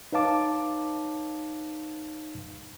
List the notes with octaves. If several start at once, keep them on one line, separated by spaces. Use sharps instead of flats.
D#4 B4 C#5 F5 A5 D6